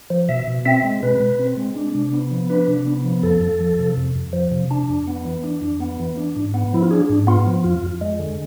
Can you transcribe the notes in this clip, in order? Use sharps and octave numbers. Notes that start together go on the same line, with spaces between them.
F3
B2 E5
B2
C4 E5
G#3
B2 B4
B2
C4
G#3
D4
C3
B3
F3
D4 B4
C3
B3
F3
F2 A4
F2
F3
C3
F2
F2
F3
C3
D4
F2
B3
E3
D4
F2
B3
E3
D4
G#2
B3
F3 E4
F4
D4 G#4
G#2
B3 F4
F3
F2 F4
F2
G#3
D3